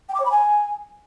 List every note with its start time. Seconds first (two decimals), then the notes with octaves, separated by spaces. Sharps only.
0.09 G5
0.14 D6
0.20 C#5
0.25 B5
0.31 G#5